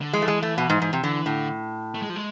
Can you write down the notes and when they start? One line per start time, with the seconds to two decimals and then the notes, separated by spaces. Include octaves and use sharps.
0.01 D3
0.13 E3 G#3
0.22 A3
0.28 G#3
0.43 A3
0.58 B2
0.70 G#2
0.82 G#2
0.93 C3
1.03 D3 E3
1.26 A2 D3
1.95 A3
2.02 G#3
2.10 F3
2.16 G#3